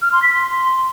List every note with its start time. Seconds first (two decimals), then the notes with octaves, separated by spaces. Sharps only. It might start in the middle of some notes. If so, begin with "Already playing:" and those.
0.02 F6
0.12 C6
0.22 B6
0.33 C6